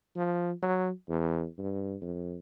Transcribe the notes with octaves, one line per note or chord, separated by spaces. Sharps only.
F3
F#3
E2
G2
F2